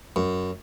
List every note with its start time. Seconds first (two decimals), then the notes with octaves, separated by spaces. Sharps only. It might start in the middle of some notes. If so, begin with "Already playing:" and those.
0.16 F#2